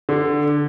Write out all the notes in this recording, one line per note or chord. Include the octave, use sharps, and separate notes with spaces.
D3